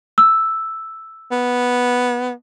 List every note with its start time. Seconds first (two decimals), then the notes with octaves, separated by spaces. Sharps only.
0.18 E6
1.32 B3